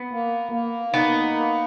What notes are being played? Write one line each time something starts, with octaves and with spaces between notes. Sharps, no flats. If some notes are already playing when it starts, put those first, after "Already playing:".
Already playing: B3
A#3
A#3
B3 D#4
A#3